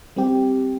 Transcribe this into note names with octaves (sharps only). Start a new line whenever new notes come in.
G3 C4 G4